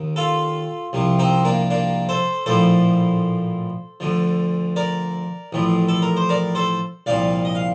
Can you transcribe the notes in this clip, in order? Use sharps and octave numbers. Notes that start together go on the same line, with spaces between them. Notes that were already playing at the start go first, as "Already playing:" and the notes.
Already playing: D#2 D#3
F4 A4
C2 C3 F3
C4 D#4
A#3 D4
A#3 D4
A4 C5
A#1 A2 F3 A4 C5
D2 D3 F3
A#4 D5
A1 A2 F3
A4
A#4
C5
A#4 D5
A4 C5
C2 A#2 F3 D5 F5
D#5
F5